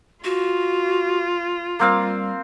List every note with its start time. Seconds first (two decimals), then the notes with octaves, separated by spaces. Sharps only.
0.24 F4 F#4
1.80 G3 A#3 C4 F5